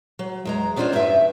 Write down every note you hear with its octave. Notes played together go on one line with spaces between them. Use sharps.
F#3
E2 G#3 A#5
B3 C#4 D4 F4 C5 D5
E2 G2 G3 B4 E5